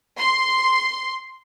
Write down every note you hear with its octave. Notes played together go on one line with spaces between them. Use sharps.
C6